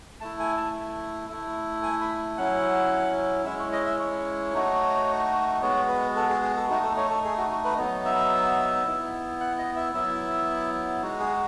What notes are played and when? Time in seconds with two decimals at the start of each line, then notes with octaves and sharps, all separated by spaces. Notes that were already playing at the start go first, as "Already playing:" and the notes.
0.21 A3 E4 A5
0.39 G#5
0.57 A5
1.30 A3 E4
1.83 G#5
2.01 B5
2.37 F#3 C#4 E4 F#5
3.45 G#3 C#4 E4 E5
3.59 C#5
3.73 D#5
3.86 E5
3.99 C#5
4.53 A3 D#4 F#4
5.61 G#3 B3 F#4 C#5
5.88 B4
6.16 A4
6.30 G#4
6.43 G#4
6.56 A4
6.69 A3 D#4 F#4
6.83 A4
6.97 C#5
7.10 A4
7.24 G#4
7.38 F#4
7.51 F#4
7.65 B4
7.78 F#3 B3 D#4
8.05 E5
8.87 B3 E4
9.40 F#5
9.58 D#5
9.76 E5
9.94 F#3 B3 E4 E5
11.02 G#3 D#4 F#4
11.20 G#4